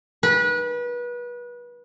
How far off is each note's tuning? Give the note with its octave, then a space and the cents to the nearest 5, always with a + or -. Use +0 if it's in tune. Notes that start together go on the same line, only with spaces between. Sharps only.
B4 -30